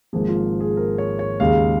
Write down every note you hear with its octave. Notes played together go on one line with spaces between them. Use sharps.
G#1 G#2 F3 A#3 G#4
F4
G#4
A#4
C#5
C#5
D#2 C#3 G#3 F5